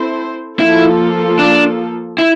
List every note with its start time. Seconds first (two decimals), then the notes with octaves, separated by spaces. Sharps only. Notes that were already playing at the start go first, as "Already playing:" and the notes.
Already playing: C4 E4 A4 C5
0.59 F3 A#3 E4 F4 A4
1.39 D4
2.18 E4